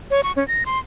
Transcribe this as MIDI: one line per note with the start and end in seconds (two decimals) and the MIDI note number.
0.11 0.21 73
0.23 0.32 85
0.36 0.46 61
0.48 0.64 94
0.66 0.79 84